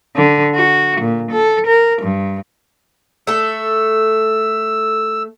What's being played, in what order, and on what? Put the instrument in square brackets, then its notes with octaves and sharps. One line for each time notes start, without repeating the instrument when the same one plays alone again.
[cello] D3
F#4
A#2
A4
A#4
G2
[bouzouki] A3 A4 [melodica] E6